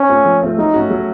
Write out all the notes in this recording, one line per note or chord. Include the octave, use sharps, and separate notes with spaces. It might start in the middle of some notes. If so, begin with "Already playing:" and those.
Already playing: C#4
A3 C4 F4
F3
A3 C4 F4
F#3 D#4
A3 C#4 F#4
F#3